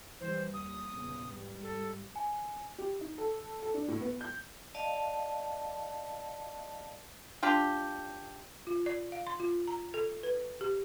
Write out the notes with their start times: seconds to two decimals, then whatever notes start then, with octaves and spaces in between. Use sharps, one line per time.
0.20 E3 G3 C5
0.54 D#2 D#6
0.91 E2 A#2 C#3
1.32 G#2 G3
1.63 A4
2.16 G#5
2.78 G4
3.01 D#4
3.18 A4
3.62 A4
3.74 D4
3.88 A2
4.01 B3
4.21 G6
4.74 D5 D#5 F5 A5
7.43 D4 F4 G4
8.67 F4
8.86 D5
9.12 F5
9.27 C6
9.40 F4
9.68 A#5
9.94 A4
10.23 B4
10.61 G4